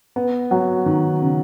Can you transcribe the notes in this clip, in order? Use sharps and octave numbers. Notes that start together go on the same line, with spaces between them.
B3
F#3
D#3
C#3